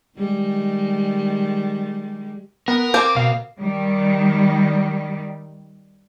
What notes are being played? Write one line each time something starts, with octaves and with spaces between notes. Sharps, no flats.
D#3 G3 G#3
B3 A#4
A#3 C4 D6
B2 F5
D#3 G3